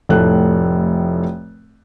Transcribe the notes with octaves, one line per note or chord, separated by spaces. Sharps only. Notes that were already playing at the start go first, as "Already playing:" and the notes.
F1 A2 A4 F#6